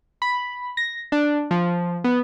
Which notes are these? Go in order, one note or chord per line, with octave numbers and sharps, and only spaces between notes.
B5
A#6
D4
F3
B3